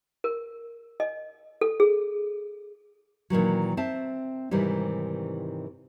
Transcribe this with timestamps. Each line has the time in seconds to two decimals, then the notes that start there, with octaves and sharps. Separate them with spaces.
0.24 A#4
1.00 D#5
1.61 A4
1.80 G#4
3.30 A#2 D#3 E3 F#3
3.77 C4 E5 A5
4.51 G#2 C3 D#3 E3 G3